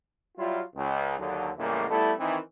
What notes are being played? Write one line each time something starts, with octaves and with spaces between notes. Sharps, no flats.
F#3 G3 E4 F4
C#2
D#2 D3 F#3
C#2 A2 E3 G3 G#3 A#3
G3 A3 B3 E4 A4
D#3 E3 C4